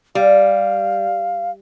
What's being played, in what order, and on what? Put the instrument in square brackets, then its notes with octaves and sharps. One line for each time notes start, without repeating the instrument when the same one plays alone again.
[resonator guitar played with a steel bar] G3 [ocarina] F5